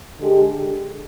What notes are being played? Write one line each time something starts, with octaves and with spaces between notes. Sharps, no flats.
D3 G#3 D4 G4